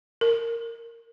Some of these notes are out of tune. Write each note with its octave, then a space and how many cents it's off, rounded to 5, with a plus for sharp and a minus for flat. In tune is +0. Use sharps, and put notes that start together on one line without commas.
A#4 -15